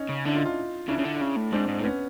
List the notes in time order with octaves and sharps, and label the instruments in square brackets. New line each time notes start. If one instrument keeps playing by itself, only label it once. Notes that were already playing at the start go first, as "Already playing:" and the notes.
Already playing: [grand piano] C#4 D#4
[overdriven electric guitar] C#3
[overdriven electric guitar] D3 [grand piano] D4 E4
[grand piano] D#4 F4
D#4 F4
[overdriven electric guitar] C#3 [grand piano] D4 E4
[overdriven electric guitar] C#3
D3
C#3
A2
[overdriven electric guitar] G#2 [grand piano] C4 D4
[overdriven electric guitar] G#2
A2
[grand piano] B3 C#4